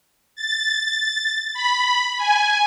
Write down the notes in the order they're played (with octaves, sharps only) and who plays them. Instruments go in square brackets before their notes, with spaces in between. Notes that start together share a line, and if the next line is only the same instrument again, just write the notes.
[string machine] A6
B5
G#5